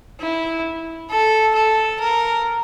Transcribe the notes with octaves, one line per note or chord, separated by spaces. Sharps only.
E4
A4
A4
A#4